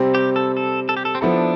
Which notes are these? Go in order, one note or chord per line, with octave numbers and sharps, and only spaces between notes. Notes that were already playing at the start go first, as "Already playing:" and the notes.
Already playing: C3 G3 C4
G4
A4
A4
A4
G4
A4
C4
F3 B3 D4 E4 A4